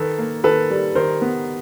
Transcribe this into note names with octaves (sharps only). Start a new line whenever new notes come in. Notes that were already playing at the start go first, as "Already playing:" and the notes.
Already playing: D#3 A4 B4
A#3
D#3 A4 B4
G3
D#3 A#4 C5
B3